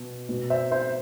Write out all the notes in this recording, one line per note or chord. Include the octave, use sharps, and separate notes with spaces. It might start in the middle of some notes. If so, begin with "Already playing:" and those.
Already playing: B2
B2
C5 E5
C5 E5